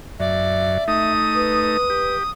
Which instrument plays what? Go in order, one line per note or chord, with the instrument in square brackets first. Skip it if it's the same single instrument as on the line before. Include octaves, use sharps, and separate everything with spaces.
[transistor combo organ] F#2 [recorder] D5 [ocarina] E5
[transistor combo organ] A3 D#4 [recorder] D#6
[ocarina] B4
[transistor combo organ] G4